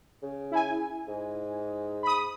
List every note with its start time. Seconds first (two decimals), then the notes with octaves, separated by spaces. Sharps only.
0.22 C#3
0.51 E4 G#5
1.08 G#2
2.03 B5 D#6